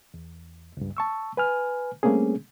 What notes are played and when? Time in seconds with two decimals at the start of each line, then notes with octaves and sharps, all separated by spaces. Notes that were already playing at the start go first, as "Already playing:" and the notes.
0.14 E2
0.77 C#2 G2
0.97 A5 C#6 E6
1.37 B4 G#5 F6
2.03 G3 A3 A#3 C4 C#4 G#4